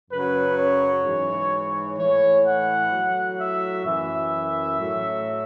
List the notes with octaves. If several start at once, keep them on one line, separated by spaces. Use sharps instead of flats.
F#2 C#3 F#3 B4
C#5
G#2 E3
A2 E3 C#5
F#5
A2 F#3
E5
F#2 E3 E5
A2 F#3